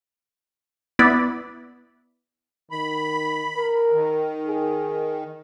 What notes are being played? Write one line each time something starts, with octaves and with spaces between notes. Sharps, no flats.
B3 E4 D5 B5
D#3 B5
A#4
D#3
G#4